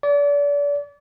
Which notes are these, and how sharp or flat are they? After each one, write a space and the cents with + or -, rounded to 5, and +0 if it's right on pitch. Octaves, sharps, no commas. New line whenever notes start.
D5 -35